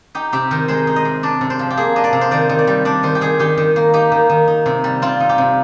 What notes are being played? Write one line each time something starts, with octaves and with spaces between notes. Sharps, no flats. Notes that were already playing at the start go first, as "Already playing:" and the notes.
D#4 G4
C3 G4
D#3 A#4
G#3 C5
D#4
D#5
C3
D4 D5
C3
C5
F3
G4
A#3 G#4
D4 D#5
D5
C3
C5
D#3 D5
D#3
D5
G3
D4 D5
D#3 C5
G4
D#3 G#4
D#3 G4
D#3
A#3
D#4 G4
D#3
D#3
D#4
C3
G3
C4 F4
D#4
G4
C3